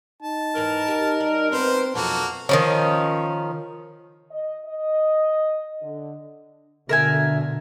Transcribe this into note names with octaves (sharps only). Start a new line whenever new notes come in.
D#4 A5
E2 G#2 E3 A#4
G4
G3
B3 C4 D#4 B4 C5
F2 B2 F#3 A#3 D#4 F#4 A4
D#3 F3 C#4
D#5
D#5
D3
B2 D3 A#4 E5 G#5